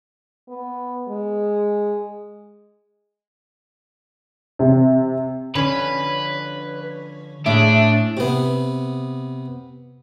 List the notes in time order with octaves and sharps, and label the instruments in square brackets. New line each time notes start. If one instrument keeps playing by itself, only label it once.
[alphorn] B3
G#3
[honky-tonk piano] C3
[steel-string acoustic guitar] D3 F3 [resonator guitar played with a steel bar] C#4 [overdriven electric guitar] B4
[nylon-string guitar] A2 [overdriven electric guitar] D4 [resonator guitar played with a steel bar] G#4 E5
[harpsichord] C3 B3